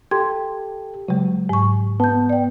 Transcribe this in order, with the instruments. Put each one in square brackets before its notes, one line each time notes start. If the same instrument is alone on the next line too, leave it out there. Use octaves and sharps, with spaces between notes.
[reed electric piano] G4 A4 [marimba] C6 G#6
[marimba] C#3 G#3 [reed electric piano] F#3
[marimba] G#2 C#6
[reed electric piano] B3 [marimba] A5 G6
[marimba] D5 G5